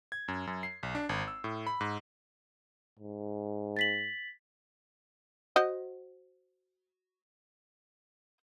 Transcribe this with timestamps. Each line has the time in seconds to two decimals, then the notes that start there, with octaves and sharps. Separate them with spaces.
0.12 G#6
0.28 F#2
0.47 F#2
0.63 C7
0.83 B1
0.95 D4
1.09 G#1
1.28 E6
1.44 A2
1.67 B5
1.81 G#2
2.99 G#2
3.77 A6 B6 F#7
5.56 F#4 C5 D#5